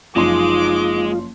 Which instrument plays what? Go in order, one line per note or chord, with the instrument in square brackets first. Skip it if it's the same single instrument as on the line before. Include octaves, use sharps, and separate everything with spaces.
[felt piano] F#1 F3 C6 [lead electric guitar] G#3 [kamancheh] D#4 D6 [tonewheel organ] F4